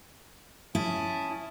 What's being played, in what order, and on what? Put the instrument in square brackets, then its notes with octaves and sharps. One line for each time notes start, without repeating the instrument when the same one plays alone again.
[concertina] C#4 A5 D#6 [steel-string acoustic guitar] E4